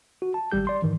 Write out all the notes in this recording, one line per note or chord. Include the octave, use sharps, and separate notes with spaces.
F#4
A5
G#1 G3 G4 G6
D5 C6
G#2 D#3 E3